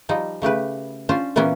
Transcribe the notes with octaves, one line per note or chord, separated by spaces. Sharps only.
F3 G3 D#4
C#3 A3 G4 B4
C#4 D4 F4 C5
A#2 E3 A#3 B3 C#4